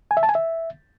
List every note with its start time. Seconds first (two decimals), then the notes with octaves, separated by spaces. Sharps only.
0.11 G#5
0.17 E5
0.23 A5
0.29 G#5
0.35 E5